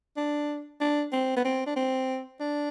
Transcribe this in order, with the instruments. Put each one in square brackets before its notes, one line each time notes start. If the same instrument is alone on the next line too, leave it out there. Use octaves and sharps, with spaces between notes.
[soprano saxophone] D4
D4
C4
B3
C4
D4
C4
D4